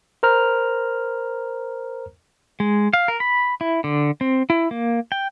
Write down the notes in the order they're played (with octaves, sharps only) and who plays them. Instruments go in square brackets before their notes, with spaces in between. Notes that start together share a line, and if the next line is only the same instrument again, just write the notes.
[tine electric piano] A#4 C5 A#5 F6
[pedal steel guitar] G#3
F5
A#4
B5
E4
D3
C4
E4
A#3
G5